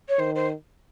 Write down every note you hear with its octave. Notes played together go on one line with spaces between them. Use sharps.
C#5
D#3 C5
C5